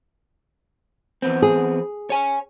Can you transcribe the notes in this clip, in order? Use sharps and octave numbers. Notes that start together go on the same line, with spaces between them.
E2 B3 C4
G#4
C#5 G#5